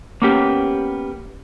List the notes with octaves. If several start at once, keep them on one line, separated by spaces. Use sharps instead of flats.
A#3 B3 C#4 G4